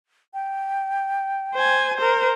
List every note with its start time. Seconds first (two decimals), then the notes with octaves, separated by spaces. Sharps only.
0.34 G5
1.54 C5 G#5
1.97 A#4 C5